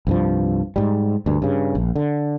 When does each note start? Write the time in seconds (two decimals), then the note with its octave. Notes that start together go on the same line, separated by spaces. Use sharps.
0.07 C2 G2 F3
0.76 G#2 G3
1.26 D2 G2
1.42 G2 C#3
1.75 A#1
1.96 D3